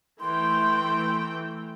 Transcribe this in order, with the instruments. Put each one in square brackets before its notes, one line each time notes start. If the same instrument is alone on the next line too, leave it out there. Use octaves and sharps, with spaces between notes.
[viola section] E3 A3 G5 [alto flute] C6